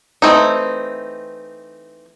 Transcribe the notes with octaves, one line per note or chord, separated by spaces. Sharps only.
E3 A3 C4 D#4